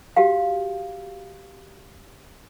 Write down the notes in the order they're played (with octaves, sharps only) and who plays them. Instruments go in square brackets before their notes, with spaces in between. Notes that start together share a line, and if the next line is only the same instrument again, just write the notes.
[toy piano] F#4 G4 F5